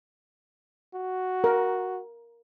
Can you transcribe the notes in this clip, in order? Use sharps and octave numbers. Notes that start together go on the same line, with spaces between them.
F#4
A#4